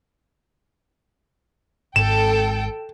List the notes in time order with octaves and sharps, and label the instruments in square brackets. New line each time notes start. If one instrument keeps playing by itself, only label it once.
[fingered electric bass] G#1 G#2 [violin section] A4 G5 [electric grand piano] E7